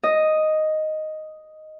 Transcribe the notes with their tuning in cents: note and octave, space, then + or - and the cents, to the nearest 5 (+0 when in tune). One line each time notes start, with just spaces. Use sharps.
D#5 +0